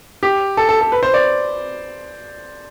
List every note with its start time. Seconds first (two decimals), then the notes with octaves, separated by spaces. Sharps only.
0.23 G4
0.57 A4
0.69 A4
0.81 A4
0.92 B4
1.03 C5
1.14 D5